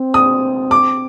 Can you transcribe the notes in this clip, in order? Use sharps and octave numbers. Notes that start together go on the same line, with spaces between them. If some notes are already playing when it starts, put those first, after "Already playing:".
Already playing: C4
D#6
D6